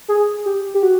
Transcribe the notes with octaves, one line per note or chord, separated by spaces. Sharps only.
G#4
G4
G4
F#4